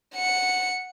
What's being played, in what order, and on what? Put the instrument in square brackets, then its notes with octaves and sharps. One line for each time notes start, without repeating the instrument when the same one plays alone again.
[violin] F#5 C#7